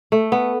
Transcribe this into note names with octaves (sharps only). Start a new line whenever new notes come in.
A3
B3